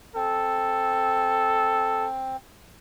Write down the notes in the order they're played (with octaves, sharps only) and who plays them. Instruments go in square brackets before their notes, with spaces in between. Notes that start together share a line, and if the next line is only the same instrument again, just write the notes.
[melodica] C4 [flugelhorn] A4